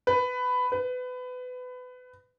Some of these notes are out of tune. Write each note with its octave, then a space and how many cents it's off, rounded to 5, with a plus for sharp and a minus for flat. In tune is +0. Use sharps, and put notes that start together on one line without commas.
B4 +15
B4 +25